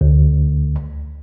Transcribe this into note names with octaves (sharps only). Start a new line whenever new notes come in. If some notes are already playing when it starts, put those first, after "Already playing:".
D2